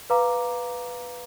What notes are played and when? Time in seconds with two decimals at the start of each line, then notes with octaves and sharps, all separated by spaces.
0.10 B4 F5 A#5 D6